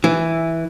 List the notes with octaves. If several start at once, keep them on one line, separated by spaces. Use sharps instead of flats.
E3